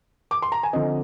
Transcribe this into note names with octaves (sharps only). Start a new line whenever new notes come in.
D6
C6
A#5
G#5
D3 F3 C4 D#5